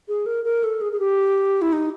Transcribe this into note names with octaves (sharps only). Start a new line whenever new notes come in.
G#4
A#4
A#4
A4
G#4
G#4
G4
E4
D#4